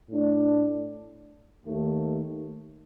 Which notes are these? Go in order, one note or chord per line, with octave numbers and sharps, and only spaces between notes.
A2 A3 D4
D#2 D#3 A3